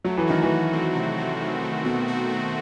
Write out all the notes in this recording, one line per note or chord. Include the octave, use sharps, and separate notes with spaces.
F#3 A3
E3
D#3 F#4
E3
A3
C4
C3 C4
A3
D#3
A3
B2 F#4
F#4
A3